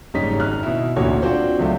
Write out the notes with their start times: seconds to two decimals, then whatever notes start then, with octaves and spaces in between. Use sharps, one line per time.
0.14 F#1 G#2 G3 C#4 D#4 B6
0.40 G#1 D#4 F6 F#6
0.63 B2 E4
0.96 A1 D2 A#2 F#4 C#5
1.22 C4 D4 F4 F#4 C5
1.59 C#2 F#2 A3